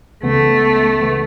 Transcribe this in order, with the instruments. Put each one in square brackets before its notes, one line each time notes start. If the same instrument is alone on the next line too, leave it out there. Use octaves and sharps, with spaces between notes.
[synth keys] C#2 C#3 E3 B3 [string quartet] A3
[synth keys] C#3 E3 B3